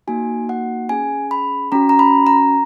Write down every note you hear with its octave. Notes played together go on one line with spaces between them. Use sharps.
A#3 D#4 F#4 G#5
F#5
C#4 G#4 G#5
B5
C#4 F#4 A#5
A#5
B5
A#5